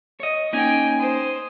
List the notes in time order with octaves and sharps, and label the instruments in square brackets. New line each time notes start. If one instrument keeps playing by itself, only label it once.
[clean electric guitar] C#5 D#5
[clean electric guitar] A#3 C#4 D#4 [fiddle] G5 G#5
[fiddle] C5 D#6